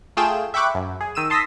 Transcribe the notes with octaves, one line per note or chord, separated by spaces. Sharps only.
A3 F4 G#4 G5 E7
E5 G5 B5 C#6 D6 F#6
F#2
G#4
D#3 E6 D#7 E7
A5 C6 D#6 E6 A#6 B6